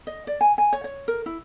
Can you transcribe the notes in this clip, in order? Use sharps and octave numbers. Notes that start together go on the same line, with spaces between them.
D#5
D5
G#5
G#5
C#5
C#5
A#4
E4